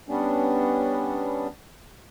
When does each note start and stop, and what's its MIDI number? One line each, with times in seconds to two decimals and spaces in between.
0.08 1.48 55
0.08 1.48 59
0.08 1.48 61
0.08 1.48 62